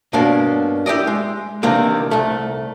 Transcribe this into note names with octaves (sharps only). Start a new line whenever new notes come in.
G2 B2 A#3 C#4 D4
E4 G4 A4 D5 D#5
G#3
C3 D#3 E3 G3 A#3 D4
C2 A3